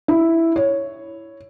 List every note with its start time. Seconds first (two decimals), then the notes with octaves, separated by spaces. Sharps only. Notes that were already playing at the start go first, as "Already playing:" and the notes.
0.08 E4
0.56 C#5